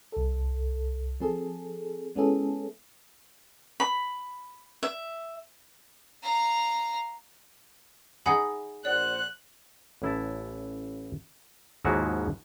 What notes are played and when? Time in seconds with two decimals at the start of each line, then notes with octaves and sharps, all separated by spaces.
0.12 C2 A4
1.20 F3 C4 G#4 A4
2.16 G#3 B3 C#4 E4 G#4 A4
3.80 B5
4.83 E5
6.23 F5 A#5
8.26 D#4 G#4 F#5 B5
8.85 A#1 C5 D5 F#5 F#6
10.02 A1 E4 A5
11.85 D#2 G#2 F3 G#3 E4 F#4